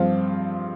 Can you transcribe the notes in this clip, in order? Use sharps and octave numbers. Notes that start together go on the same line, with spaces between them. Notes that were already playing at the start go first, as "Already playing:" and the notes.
Already playing: G2 F3 C4 F4